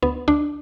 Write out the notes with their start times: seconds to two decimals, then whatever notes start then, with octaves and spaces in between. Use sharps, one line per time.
0.03 D2 B3
0.28 D2 D4